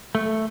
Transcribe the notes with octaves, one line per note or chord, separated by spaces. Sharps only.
A3